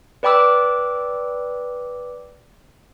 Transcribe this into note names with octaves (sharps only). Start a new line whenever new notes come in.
B4 D5 G5 B5 D6 E6